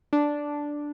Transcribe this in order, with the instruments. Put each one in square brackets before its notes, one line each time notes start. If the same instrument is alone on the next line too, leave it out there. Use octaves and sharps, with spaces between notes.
[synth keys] D4